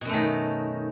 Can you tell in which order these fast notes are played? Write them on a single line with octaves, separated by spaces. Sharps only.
B2 F#2 A3 D#3